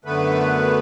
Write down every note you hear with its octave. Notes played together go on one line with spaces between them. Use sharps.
F#2 D3 A3 B3 B4